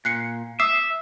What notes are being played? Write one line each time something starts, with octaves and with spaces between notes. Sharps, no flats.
A#2 F#6 C7 C#7
E5 D6 D#6 C7